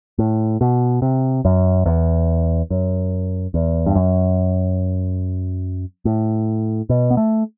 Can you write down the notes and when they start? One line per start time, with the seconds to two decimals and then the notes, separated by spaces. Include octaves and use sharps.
0.18 A2
0.61 B2
1.02 C3
1.45 F#2
1.86 E2
2.70 F#2
3.54 E2
3.86 G2
3.95 F#2
6.05 A2
6.89 B2
7.11 B3
7.17 A3